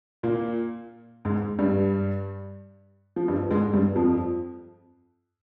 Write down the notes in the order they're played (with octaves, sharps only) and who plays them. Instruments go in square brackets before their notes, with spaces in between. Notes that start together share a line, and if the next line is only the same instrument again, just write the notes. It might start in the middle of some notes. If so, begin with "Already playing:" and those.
[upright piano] A#2 A#3
G#2 G#3
G2 G3
F3
G2 G3
G#2 G#3
G2 G3
F2 F3